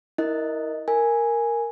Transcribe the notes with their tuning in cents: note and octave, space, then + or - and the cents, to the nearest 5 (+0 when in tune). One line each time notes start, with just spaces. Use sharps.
E4 -25 A#4 +0 D#5 +0
A#4 +0 G#5 +0